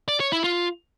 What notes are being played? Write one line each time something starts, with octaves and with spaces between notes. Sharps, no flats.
D5
C#5
E4
F4